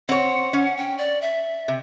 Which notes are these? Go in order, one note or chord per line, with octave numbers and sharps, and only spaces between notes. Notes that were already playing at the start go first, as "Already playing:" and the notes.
C4 C#5 F#5
C#4
G5
D5
E5
C3